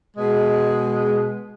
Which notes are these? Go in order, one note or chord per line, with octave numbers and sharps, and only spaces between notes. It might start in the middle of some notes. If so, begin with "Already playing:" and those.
B2 G#3 G#4